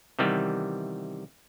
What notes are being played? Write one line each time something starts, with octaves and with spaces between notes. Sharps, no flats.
C3 D#3 E3 G3 B3